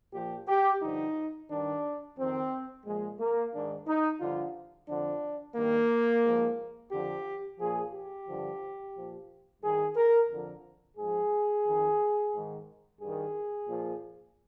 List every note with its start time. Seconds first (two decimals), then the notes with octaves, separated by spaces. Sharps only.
0.14 A#2 F3 G4
0.48 G4
0.82 G2 D3 F3 D#4
1.50 G2 D#3 D4
2.18 F2 D#3 C4
2.86 A#2 F3 G#3
3.19 A#3
3.53 G#2 D#3 D4
3.87 D#4
4.20 G2 D3 F3 F4
4.88 F2 D3 F3 D4
5.56 G2 D#3 A#3
6.24 G#2 F3
6.92 F2 D3 F3 G4
7.59 A#2 F3 G#4
7.93 G4
8.28 G2 D3 F3
8.94 A#2 F3
9.62 G2 D#3 G#4
9.96 A#4
10.30 F2 D3 F3
10.97 G#2 F3 G#4
11.66 F2 D#3
12.34 G#2 D#3
13.01 G2 D#3 G#4
13.68 A#2 F3